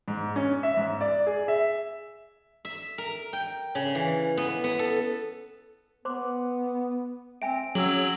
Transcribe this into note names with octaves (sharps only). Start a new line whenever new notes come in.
G#2
C#4
E5
G#2
D5
G#4
E5
E5
A#4
G5
C#3
E3
B3
B3
A4
B3 C5 C6 D6
C4 E5 G5 G#5 D7
F#3 C#4 G#4 F#5 E6 F#7